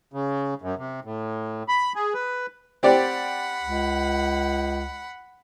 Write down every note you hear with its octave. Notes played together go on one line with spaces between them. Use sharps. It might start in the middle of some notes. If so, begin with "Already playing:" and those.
C#3
F#2
C3
A2
B5
G#4
B4
C4 G4 D5 F#5 B5
C#2